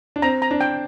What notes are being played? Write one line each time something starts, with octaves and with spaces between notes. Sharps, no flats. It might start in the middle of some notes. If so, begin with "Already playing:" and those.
D4
C4 A#5
A#5
D4
G5